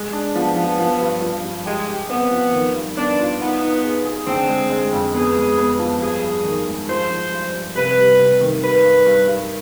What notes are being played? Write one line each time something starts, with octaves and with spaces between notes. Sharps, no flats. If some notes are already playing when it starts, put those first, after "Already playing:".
Already playing: G#3
D4
F3 B3
F3
F3
G2
F3
G2
G#3 G4
G4
B3 C4
F3
D#3
G2
B3 D4
F4
B3 D#4
D#4
G#4
G#4
D3 C4
G#3
G#3
F2
B3 G#4
G#3
B3
F3
G2 G#4
G2
D#3
G#3
F3 C5
F3
G2
G2
C3 B4
G3
C3
D#3
G3 B4
G2
G2
G2